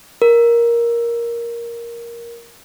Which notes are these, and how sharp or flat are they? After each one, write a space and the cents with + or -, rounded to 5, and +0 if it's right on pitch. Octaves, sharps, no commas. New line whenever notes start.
A#4 +10